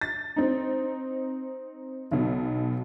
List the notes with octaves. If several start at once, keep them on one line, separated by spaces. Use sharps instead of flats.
A6
C4 D#4
B1 B2